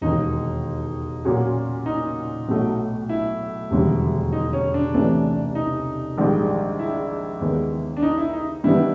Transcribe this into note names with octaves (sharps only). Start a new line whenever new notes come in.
E1 D#2 D#3 D#4
A#2 F#3 A#3 C#4 F#4
D#4
B1 A2 F#3 A3
E4
E1 D#2 D3 G3
D#4
C#4
D4
C2 C3 E3 A3 C#4 D4
D#4
A#1 G#2 D#3 G3
E4
D#2 D#3 G#3 B3
D4
D#4
E4
D#4
G2 D#3 G3 B3 D4 E4